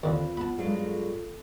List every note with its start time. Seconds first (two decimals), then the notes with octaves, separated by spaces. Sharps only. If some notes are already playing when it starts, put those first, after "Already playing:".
0.04 D#2 D3 C4 F4 B4 F5
0.37 B3 A5 B5
0.58 G2 F#3 G#3 A4 F5